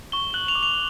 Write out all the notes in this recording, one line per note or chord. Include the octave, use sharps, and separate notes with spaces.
C#6 G7
F#6 F#7
F7
D6
F7